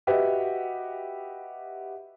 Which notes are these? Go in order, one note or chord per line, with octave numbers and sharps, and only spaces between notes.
F#4 G4 B4 D#5 E5 F#5